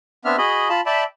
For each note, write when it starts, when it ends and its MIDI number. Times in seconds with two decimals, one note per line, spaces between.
0.25 0.36 59
0.25 0.36 60
0.25 0.36 62
0.25 0.36 76
0.25 0.36 89
0.38 0.69 66
0.38 0.69 68
0.38 0.69 75
0.38 0.69 83
0.69 0.81 65
0.69 0.81 81
0.69 0.81 83
0.86 1.04 74
0.86 1.04 76
0.86 1.04 79
0.86 1.04 81
0.86 1.04 83